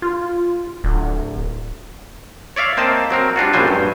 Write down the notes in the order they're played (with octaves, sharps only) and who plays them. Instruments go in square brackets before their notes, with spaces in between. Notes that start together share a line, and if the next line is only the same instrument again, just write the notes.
[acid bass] F4
D1
[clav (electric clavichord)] C#5 D5 E5 F5
A#3 C4 C5 D#5 A5
F#3 C4 A#4
G3 D4 F4 F#4
A#1 F#2 F#3 G3 C5 G#5
G2